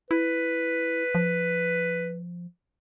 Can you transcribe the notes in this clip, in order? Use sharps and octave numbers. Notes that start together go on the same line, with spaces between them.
E4 B4
F3